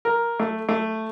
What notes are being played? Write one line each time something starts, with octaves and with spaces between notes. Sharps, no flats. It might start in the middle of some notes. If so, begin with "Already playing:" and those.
A#4
A3
A3